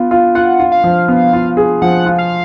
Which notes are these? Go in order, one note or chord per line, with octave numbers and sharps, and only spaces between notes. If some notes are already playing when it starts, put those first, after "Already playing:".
Already playing: B3 F4
F4
F4 F#5
F4
F5
F3
B3
F4
G#4
F3 F#5
F4
F5